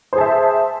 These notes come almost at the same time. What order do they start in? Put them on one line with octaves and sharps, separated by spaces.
C5 G#4 A5 E5